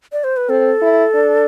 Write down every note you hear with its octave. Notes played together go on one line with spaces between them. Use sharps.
D5
C5
B4
C4 A4
E4
D4